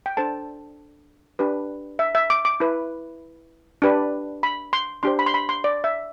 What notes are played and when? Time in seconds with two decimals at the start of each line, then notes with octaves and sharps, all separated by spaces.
0.06 G5
0.17 D4 A4 C5 A5
1.39 D4 G4 B4
1.99 E5
2.15 E5
2.30 D6
2.45 D6
2.60 E4 B4
3.82 D4 G4 B4
4.43 B5
4.73 C6
5.03 D4 G4 C5 C6
5.19 B5
5.26 C6
5.34 B5
5.49 C6
5.64 D5
5.84 E5